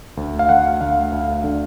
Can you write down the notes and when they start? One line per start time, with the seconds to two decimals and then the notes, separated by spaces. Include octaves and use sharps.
0.17 D2
0.39 F5
0.49 D2 F#5
0.81 D2 F5
1.13 D2
1.44 D3